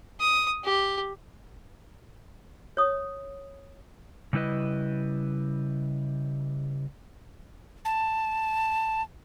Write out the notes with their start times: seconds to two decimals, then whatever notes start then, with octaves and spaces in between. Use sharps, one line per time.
0.20 D#6
0.64 G4
2.77 C#5 D#6
4.33 C#3 G3 E4 B4 D#5
7.85 A5